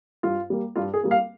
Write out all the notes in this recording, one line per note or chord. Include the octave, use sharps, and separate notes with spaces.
G2 F4
G3 A#3
G2 F4
G#4
G3 A#3
F5